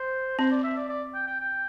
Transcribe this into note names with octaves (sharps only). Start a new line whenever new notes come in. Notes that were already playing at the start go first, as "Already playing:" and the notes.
Already playing: C5
C4 C5
D5
E5
D5
D5
G5
G5
G5